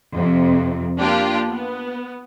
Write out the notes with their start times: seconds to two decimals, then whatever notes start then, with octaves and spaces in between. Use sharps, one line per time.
0.15 F2 C3
0.99 A#3 D4 F4 G4
1.50 B3